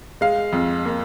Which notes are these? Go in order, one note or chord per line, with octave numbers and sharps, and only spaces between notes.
G#3 F5
F2
A#3